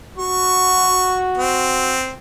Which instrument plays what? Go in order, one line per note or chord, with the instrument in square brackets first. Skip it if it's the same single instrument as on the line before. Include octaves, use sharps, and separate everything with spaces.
[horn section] F#4 [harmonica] C#6
[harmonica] C4